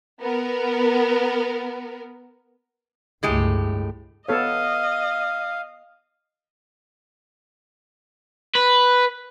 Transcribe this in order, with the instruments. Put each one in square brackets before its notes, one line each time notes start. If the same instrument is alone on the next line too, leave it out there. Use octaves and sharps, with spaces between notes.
[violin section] B3 A#4
[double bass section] G1 C#2 A3 [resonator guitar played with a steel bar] A2 G#3 G4
[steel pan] B3 A4 C#5 [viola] D#5 [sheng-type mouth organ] F5
[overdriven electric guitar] B4